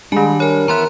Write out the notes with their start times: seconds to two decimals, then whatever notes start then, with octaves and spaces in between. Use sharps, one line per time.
0.12 D#3 G3 G#3 D4 G#5
0.40 A#4 C#5 G#5
0.68 E3 B3 E5 A#5 C6 F#6